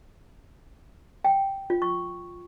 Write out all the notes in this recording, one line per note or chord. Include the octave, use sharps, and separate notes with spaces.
G5
F4
C#6